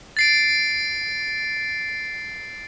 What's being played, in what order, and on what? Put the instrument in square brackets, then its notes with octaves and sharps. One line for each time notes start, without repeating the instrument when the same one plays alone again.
[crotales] A6 C7 D7